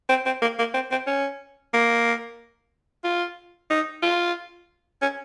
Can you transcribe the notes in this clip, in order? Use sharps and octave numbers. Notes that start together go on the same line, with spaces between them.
C4
C4
A#3
A#3
C4
C4
C#4
A#3
F4
D#4
F4
C#4